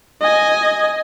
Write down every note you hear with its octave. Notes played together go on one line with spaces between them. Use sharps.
D#5 G#5